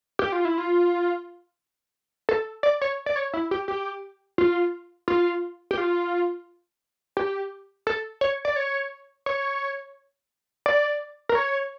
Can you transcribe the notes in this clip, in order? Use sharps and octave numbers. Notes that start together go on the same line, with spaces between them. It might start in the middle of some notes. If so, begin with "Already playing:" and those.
G4
F4
E4
F4
A4
D5
C#5
D5
C#5
E4
G4
G4
F4
F4
G4
F4
G4
A4
C#5
D5
C#5
C#5
D5
A#4
C#5